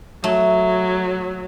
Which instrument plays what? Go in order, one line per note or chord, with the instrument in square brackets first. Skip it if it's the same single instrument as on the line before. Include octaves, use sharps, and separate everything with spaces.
[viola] F#3 [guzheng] A3